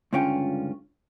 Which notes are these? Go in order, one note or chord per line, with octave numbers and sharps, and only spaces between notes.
C#2 G2 D3 C#4 F4 G5